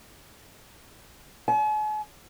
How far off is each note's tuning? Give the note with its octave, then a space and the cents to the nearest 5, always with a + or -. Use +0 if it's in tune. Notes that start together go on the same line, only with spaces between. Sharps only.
G#5 +45